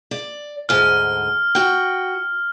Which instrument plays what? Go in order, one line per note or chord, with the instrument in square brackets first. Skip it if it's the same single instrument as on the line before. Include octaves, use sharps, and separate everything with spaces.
[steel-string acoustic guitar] D5
[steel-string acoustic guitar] D2 G#2 G#5 [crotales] F6
[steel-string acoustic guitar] F#4 G5